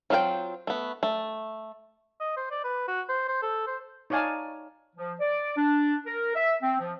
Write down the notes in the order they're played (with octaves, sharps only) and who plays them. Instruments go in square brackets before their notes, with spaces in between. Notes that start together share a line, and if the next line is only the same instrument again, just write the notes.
[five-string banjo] F#3 C4 F4 A#4 G5
A3 B3
A3
[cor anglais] D#5
C5
D5
B4
F#4
C5
C5
A4
C5
[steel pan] D#4 C#5 D5 F5 G#5 A5
[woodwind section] F3
D5
D4
A#4
E5
C4
F3